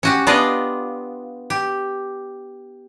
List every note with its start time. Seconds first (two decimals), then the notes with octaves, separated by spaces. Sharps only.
0.03 C#4 F#4 G4
0.27 B3 D4 F4 D5 D#5
1.50 G4